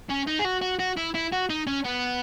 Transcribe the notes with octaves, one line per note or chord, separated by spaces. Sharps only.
C#4
D#4
G#4
F#4
F#4
F#4
E4
E4
F#4
D#4
C#4
B3